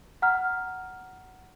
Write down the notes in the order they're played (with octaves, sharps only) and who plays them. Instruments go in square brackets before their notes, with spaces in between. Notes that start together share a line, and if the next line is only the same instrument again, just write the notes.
[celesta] F#5 A#5 F6